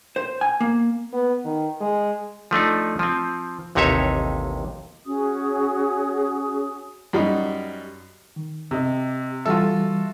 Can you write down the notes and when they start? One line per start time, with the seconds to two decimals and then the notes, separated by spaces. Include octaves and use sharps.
0.16 C5
0.41 G#5
0.60 A#3
1.13 B3
1.44 D#3
1.81 G#3
2.51 F3 A3 D4 D#4
2.99 F3 C4
3.75 A1 D#2 C3 D#4 C#5 E5
5.05 C#4 F#4 G#4 D#6
7.13 F#2 G3 D#4
8.36 D#3
8.71 C3 G4 D#5
9.45 E3 G3 F4 F#4 A4 E5